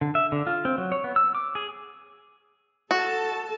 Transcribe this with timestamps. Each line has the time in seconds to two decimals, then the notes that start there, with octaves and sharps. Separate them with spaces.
0.01 D3
0.15 E5
0.32 D3
0.47 F4
0.65 C4
0.78 F#3
0.92 C#5
1.04 B3
1.16 E6
1.35 D6
1.55 G#4
2.91 F#4 A4 A5